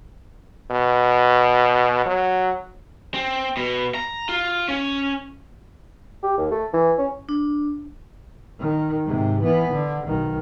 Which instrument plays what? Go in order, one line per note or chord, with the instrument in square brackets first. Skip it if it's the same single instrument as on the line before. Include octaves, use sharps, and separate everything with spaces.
[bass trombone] B2
F#3
[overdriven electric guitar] C4
B2
A#5
F4
C#4
[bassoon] G4
D#2
A3
E3
C#4
[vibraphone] D4
[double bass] D#3
G#2 C3
E3 B3
D3
B1 D#3